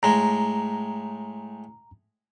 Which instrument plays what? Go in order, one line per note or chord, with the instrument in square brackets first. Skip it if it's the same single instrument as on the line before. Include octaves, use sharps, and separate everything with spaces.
[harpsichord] A2 G#3 [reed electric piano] A#5